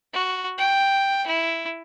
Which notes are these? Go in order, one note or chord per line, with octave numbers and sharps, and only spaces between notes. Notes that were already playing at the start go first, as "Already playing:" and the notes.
F#4
G5
E4